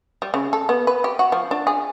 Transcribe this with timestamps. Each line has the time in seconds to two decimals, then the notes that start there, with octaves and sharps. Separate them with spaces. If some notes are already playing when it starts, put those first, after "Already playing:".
0.22 G3
0.34 C#3
0.53 A4
0.69 B3
0.87 B4
1.04 G4
1.19 F#4
1.32 F3
1.51 D4
1.67 G#4